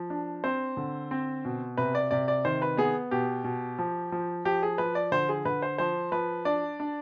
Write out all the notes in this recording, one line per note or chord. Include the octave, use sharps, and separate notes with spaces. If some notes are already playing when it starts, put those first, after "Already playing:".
Already playing: F3
D4
C4 C5
D3
C4
B2
C3 B4
D5
C3 D5
D5
D#3 C5
B4
B3 G#4
B2 G4
B2
F3
F3
F3 G4
G#4
F3 B4
D5
D3 C5
G#4
D3 B4
C5
F3 C5
F3 B4
D4 D5
D4